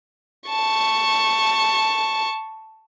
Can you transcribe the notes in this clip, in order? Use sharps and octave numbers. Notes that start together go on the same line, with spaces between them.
A5 C#6